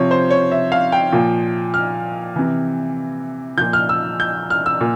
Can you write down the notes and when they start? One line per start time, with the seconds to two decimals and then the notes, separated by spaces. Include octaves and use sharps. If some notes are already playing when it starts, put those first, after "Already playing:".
Already playing: C3 F3 C#5
0.11 C5
0.30 C#5
0.51 E5
0.72 F5
0.92 G5
1.12 A#2 F3
1.74 F6
2.36 C3 E3
3.58 A#2 F3 G6
3.73 F6
3.89 E6
4.20 G6
4.50 F6
4.66 E6
4.81 A#2